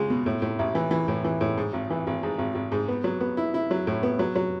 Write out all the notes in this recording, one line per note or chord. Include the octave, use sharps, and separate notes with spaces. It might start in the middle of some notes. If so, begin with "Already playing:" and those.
Already playing: C#2 G#3
B2
A2
A2
A1
E3
E3
A2
E3
A2
G#2
G#1
E3
G#1
G#2
G#1
G#1
G#2
B3
F#3
B3
E4
E4
F#3
A2
B3
F#3
F#3